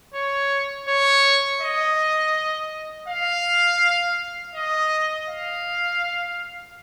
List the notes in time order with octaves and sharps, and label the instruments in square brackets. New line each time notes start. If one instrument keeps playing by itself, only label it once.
[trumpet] C#5
C#5
D#5
F5
D#5
F5